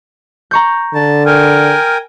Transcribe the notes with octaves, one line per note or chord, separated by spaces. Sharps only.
A#5 C#6 G6
D3 A5
A#4 G5 G#5 F6